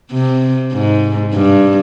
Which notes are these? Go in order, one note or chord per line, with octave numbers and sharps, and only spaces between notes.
C3
G#2
G2